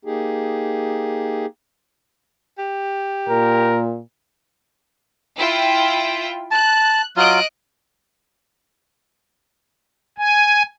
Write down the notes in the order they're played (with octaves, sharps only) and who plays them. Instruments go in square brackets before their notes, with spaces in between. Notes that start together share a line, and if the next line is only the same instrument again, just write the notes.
[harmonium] A#3 D#4 G4 G#4
[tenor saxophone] G4
[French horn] A#2 [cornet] A#4
[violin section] E4 F4 G5
[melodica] A5 [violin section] F#6
[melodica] F#3 F4 [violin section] D#5 F#6 D7
[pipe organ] G#5